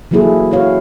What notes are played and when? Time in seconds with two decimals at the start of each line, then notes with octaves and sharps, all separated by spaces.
0.11 E3 F#3 A#3 E4 G#4 A4
0.51 E4 F#4 C#5 F5